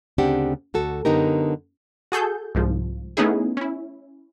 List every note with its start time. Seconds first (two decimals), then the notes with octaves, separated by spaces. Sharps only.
0.18 D2 C#3 C4 D4 G4 F#5
0.74 D2 F#4 A4
1.05 F#2 D3 B3 D#4 G4 A#4
2.12 F#4 G#4 A4 G6
2.55 C2 G#2 F3
3.17 A3 B3 C#4 D#4 E4 G#4
3.57 C#4 E4